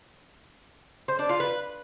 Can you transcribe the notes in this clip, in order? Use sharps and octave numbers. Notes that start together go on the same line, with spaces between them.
C5
D4
F4
B4